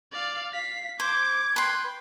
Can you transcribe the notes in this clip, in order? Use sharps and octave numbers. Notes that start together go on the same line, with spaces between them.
D5 F5
F5 B6
C5 D6 G#6
B4 G5 C6